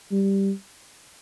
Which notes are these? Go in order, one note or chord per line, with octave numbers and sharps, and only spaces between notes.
G3